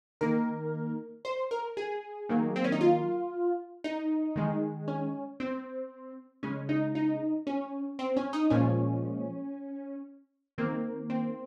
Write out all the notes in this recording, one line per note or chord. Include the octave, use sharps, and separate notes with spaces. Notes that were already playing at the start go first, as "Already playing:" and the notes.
D#3 A#3 A#4
C5
A#4
G#4
D#3 F#3 A#3
C4
C#4
D#4
F4
D#4
D#3 G#3
C#4
C4
C#3 G#3 C#4
D#4
D#4
C#4
C4
C#4
D#4
A#2 F3 G#3 C#4
D#3 A#3 C4
C4